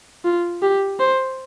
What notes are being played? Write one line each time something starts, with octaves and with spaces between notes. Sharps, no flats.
F4
G4
C5